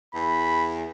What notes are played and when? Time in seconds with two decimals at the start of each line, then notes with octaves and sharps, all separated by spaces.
0.14 E2 B5